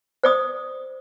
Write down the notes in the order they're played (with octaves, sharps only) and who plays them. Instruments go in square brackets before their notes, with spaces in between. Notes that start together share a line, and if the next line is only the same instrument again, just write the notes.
[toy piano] C5 D5 D#6